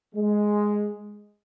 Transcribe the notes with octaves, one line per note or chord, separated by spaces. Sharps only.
G#3